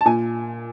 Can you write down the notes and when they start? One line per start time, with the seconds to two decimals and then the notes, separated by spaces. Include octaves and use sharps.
0.01 A5
0.05 A#2 G#5